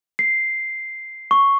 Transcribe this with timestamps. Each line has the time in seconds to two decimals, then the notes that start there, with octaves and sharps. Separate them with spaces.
0.19 C7
1.31 C#6